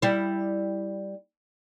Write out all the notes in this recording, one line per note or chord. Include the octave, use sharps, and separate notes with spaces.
G3 E4